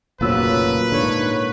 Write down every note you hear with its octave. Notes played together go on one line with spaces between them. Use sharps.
F1 A#2 C#3 F3 F#3 B4 E6
G#2 D3 C#5